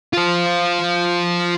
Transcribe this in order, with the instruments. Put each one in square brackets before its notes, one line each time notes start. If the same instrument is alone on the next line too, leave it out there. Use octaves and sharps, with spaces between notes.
[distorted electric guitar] F4 C5